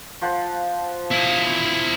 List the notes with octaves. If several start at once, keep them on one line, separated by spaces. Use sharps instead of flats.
F3 C5 F#5
E4 D#5